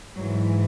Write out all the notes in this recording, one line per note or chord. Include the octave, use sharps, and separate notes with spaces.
G#2 E3 F#3